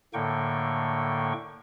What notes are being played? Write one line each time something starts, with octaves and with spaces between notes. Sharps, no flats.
A2 D3 A#3 G5 C#6